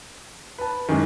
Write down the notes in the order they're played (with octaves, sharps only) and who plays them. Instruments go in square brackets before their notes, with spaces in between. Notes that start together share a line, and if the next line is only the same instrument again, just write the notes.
[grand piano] B4 A5
[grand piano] F#2 E3 G#3 [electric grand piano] D#3